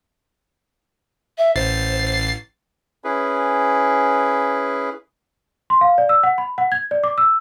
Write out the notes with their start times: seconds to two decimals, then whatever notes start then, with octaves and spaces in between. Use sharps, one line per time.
1.38 E5
1.56 A1 C5 A6 C7
3.04 C#4 E4 G#4 B4
5.70 C6
5.81 F5
5.98 D5
6.09 E6
6.23 F#5
6.38 B5
6.58 F#5
6.72 G#6
6.91 D5
7.04 D6
7.18 E6